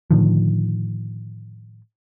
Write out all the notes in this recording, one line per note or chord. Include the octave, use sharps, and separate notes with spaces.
A2 D3 D#3 F3